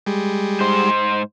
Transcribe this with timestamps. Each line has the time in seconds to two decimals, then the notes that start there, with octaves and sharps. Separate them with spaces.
0.06 G3 G#3
0.61 G#2 C5